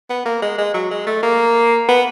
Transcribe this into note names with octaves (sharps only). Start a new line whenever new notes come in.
B3
A#3
G#3
G#3
F#3
G#3
A3
A#3
B3